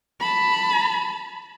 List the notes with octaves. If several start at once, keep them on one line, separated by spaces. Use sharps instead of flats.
A5 B5